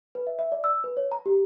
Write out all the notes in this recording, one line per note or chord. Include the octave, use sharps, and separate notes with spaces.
B4
E5
E5
D5
E6
B4
C#5
A#5
G4